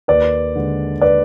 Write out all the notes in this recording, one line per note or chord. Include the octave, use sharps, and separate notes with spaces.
D#2 B4 D5
D3 G#3
B4 D5